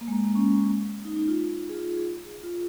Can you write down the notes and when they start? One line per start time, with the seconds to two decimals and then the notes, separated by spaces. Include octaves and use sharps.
0.01 A#3
0.08 G#3
0.12 A#3
0.24 A#3
0.35 C#4
1.05 D#4
1.16 D#4
1.28 F4
1.69 G#4
1.74 F4
1.86 G#4
1.97 G#4
2.43 F4